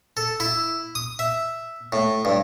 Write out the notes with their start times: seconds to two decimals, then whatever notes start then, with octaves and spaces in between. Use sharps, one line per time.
0.17 A4
0.40 E4
0.95 D#6
1.19 E5
1.92 A2
2.25 G2